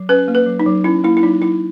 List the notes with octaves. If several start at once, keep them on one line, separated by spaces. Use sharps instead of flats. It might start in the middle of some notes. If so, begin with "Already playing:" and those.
Already playing: F#3
C#4 B4
A#3
B4
F#3
D#4
F#3
C#4 E4
A#3 E4
E4
F#3 D#4
F#3 E4